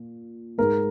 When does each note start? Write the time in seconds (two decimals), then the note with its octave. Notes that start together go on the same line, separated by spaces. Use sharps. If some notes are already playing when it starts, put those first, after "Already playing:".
Already playing: A#2
0.58 G#2 G#3 A#4